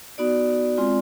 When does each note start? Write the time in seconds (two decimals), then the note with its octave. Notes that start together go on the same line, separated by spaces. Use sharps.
0.18 B3 D#4 F#4 D5
0.77 G#3 C4 F4